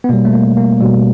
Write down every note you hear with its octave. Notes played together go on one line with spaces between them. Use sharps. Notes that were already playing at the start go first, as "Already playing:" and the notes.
B3
B2 G3 A#3
A3
A#3
A#3
B2 G3